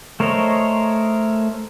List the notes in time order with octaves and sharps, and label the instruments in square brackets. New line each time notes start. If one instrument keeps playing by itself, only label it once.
[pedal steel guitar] A3 A#4 C5 C#5 D#5